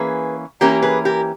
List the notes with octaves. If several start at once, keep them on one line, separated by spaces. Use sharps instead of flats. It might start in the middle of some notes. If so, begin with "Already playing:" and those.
Already playing: E3 A#3 C#4 G#4 B4
E3 A#3 C#4 G4 A#4
G#4 B4
G4 A#4